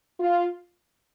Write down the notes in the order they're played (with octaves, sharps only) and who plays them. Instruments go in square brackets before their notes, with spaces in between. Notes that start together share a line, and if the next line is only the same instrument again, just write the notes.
[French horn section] F4